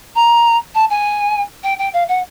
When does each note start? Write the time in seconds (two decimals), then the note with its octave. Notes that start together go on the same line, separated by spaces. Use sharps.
0.16 A#5
0.75 A5
0.90 G#5
1.64 G5
1.79 G5
1.93 F5
2.09 F#5